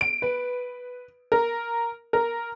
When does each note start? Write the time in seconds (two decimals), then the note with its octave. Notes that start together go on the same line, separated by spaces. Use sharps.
0.01 D7
0.22 B4
1.32 A#4
2.13 A#4